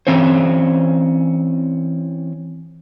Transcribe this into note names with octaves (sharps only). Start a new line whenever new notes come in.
E3 C4 C#4 C5